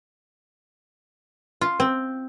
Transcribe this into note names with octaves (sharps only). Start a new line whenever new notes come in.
F4
C4